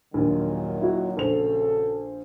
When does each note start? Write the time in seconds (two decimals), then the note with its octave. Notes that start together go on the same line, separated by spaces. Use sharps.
0.14 A#1 D#2 A#2 D#3 F#3
0.81 E4 F#4
1.17 A#1 C#3 F#4 A4 C5 F7